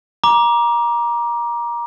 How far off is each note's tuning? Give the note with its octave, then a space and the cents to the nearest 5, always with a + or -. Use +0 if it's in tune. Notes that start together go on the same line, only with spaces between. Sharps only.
A#5 +25 D6 +0